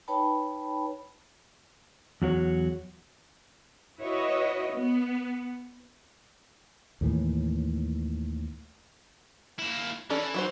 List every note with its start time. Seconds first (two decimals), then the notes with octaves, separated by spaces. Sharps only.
0.08 D#4 B4 C#5 G5 A5 B5
2.22 E2 F#3 F#4 C#5
4.00 E4 F#4 B4 C#5 D#5
4.73 B3
7.01 D#2 A2 E3
9.59 A#3 E4
10.10 E3 C#4 A4 D5
10.34 F#3 F#4 C5